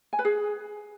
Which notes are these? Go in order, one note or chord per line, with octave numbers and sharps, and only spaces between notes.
G#5
B4
G#4